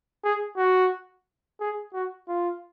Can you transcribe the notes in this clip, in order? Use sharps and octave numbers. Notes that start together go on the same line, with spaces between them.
G#4
F#4
G#4
F#4
F4